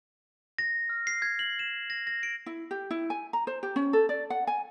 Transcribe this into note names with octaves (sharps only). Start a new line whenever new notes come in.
A#6
F6
C7
G#6
F#7
E7
A#6
A#6
D7
E4
G4
E4
G#5
A#5
C5
G4
C#4
A4
D5
F#5
G#5